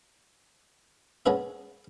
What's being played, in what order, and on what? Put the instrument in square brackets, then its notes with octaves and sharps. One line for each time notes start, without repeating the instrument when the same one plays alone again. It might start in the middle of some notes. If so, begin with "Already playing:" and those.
[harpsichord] G#3 B3 C#4 G#4 B4 E5